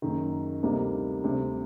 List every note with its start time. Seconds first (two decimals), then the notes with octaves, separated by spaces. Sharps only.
0.02 F#1 F#2 D#3
0.63 D2 C3 G3 A#3 D#4
1.24 D2 C3 G3